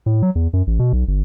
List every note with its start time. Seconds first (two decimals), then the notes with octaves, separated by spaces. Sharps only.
0.06 A2
0.23 F#3
0.35 E2
0.53 F#2
0.67 A1
0.79 B2
0.93 B1
1.08 G1